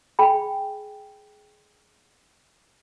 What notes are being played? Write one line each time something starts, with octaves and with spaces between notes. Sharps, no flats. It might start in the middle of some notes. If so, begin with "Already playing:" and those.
G#4 G5 G#5 B5